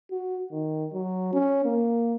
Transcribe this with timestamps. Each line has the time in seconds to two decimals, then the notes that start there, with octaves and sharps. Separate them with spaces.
0.11 F#4
0.52 D#3
0.93 F#3
1.33 C#4
1.65 A#3